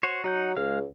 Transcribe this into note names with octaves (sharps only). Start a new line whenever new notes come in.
F#4 C5 C#5
F#3 D#4 F#5 G6
C#2 G#3 F5 F6